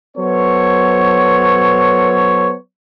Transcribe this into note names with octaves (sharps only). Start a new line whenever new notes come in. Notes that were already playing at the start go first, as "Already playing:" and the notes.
F#3 B3 A4 C5 C#5